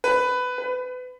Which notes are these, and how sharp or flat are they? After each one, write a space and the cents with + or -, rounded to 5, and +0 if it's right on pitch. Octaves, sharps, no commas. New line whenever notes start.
B4 +15
B4 +30